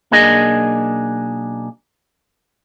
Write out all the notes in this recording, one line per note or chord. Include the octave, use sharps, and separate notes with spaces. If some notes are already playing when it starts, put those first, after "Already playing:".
B1 A#3 D4 G#4 D#5